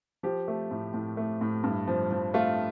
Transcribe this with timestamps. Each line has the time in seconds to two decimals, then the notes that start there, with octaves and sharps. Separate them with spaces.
0.23 F3 G4
0.48 A3
0.71 A2
0.94 A2
1.17 A3
1.41 A2
1.64 G2
1.87 F3
2.11 F3
2.34 A3 F4